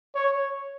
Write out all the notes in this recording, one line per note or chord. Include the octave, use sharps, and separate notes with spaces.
C#5